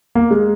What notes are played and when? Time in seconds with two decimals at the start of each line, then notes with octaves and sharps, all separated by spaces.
0.15 A#3
0.31 G#3